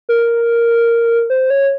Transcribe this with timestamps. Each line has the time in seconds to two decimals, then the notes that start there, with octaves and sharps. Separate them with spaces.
0.09 A#4
1.30 C5
1.50 C#5